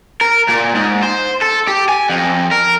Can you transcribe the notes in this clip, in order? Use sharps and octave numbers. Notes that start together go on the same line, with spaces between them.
A#4
A#2
G#2
C5
A4
G4
G#5
F2
A#4